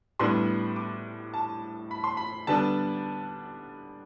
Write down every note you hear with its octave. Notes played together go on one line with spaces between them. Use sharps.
A2 G3 B3 D4 C6
D6
A5
B5
C6
B5
D3 G3 B3 D4 A5